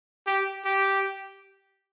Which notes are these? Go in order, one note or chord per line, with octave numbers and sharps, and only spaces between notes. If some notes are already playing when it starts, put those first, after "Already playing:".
G4
G4